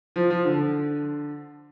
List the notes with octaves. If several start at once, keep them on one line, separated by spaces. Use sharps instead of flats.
F3
F3
D3